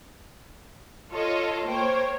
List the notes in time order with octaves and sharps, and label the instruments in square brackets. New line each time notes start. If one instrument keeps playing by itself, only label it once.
[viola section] F4 [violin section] A4 C#5 D#5
[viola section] A#3 C#5 [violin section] C5 G5